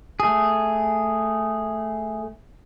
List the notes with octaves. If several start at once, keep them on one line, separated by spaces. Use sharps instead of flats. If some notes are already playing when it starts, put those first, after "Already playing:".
A3 G#4